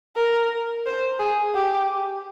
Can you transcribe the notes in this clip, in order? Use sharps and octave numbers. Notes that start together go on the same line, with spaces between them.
A#4
C5
G#4
G4